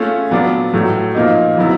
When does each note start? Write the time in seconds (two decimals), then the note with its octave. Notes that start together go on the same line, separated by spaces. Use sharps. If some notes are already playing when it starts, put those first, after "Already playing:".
Already playing: A3 C#4 F4 G#4
0.31 A#2 F#3 B3 D4
0.73 A2 F#3 A3
1.15 A#2 F3 A#3 D#4
1.57 C#3 F#3 B3 E4